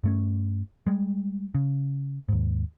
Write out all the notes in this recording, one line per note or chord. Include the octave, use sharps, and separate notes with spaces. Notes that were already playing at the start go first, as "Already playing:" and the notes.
G2 A3 C#4
G3 G#3
C#3
D#2 G#2